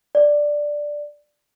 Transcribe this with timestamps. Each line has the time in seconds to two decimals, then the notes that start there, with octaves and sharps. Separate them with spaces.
0.15 D5